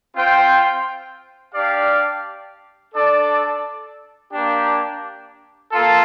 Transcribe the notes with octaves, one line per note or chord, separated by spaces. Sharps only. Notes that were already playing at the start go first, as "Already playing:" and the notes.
C4 F4 C5 G5
D4 G4 D5 F5
D4 A4 D5
A#3 D4 G4
A#3 F4 A4